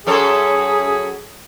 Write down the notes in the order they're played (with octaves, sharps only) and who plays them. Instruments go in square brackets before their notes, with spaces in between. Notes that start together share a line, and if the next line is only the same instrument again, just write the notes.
[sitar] F#2 A4 C#5 [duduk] G#4